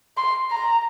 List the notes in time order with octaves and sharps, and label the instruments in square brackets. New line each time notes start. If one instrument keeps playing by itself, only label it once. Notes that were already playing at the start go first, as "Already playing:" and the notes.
[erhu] C6
A#5